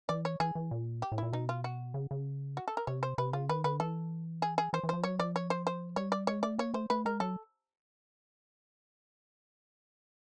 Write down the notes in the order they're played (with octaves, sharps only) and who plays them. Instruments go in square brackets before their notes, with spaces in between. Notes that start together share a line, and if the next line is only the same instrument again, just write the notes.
[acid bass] E3 [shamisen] D5
[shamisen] C#5
[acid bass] E3 [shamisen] G#4
[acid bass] E3
A#2
[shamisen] G4
[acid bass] A2
[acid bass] A#2 [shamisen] E4
[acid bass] B2 [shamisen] D#4
[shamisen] F4
F#4
[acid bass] C#3
C#3
[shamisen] F#4
A4
A#4
[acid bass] C3 [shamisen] C#5
[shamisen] C5
[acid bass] C3 [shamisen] B4
[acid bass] C#3 [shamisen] F4
[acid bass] D#3 [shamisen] B4
[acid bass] D3 [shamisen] B4
[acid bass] E3 [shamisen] A4
[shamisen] G#4
G#4
[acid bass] E3 [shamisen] C5
[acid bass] E3
[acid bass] F3 [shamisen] C5
[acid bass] F#3 [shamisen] C#5
[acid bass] F3 [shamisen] D5
[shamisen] C#5
C5
C5
[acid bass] G3 [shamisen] C#5
[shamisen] D5
[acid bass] G#3 [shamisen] C#5
[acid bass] A3 [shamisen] D5
[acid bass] A#3 [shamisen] C#5
[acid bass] A3 [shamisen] C5
[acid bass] A3 [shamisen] B4
[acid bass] G#3 [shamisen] A#4
[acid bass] F#3 [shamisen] A4